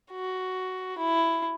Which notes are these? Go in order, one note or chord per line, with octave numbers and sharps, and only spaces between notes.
F#4
E4